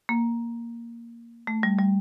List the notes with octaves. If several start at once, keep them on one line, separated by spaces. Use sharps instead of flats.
A#3
A3
G3
G3